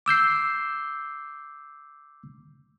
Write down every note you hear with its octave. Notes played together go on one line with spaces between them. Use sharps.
D6 E6 G6 C7